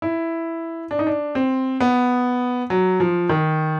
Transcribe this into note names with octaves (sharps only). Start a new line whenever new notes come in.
E4
D4
D#4
D4
C4
B3
F#3
F3
D#3